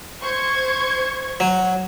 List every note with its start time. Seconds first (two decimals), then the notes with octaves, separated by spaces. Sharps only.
0.22 C5 C#6 G#6
1.40 F#3